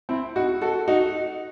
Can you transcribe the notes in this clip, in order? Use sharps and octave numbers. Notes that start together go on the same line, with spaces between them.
C4 E4
D#4 F#4
F#4 A4
D#4 F#4